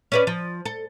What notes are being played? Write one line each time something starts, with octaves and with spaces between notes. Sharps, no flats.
C#4 B4 D5
F3
A4